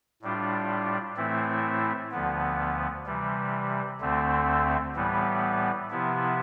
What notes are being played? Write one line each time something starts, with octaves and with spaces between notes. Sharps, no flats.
A2 G3 D4 F4
A2 E3 A3 C4 E4
D2 D3 F3 B3
C3 E3 G3
D2 D3 A3 C4
A2 E3 G3 B3
C3 F3 B3 E4